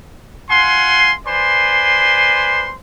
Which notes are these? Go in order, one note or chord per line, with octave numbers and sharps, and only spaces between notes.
F4 F#5 G#5 C6
B4 C5 D5 G#5 C6